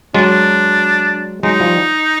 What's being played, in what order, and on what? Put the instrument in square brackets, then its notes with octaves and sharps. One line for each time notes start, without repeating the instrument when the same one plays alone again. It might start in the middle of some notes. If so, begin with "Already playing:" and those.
[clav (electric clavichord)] F#3 G#3 [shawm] D4
[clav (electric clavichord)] F#3 G#3 [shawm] D#4
[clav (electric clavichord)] F3 G3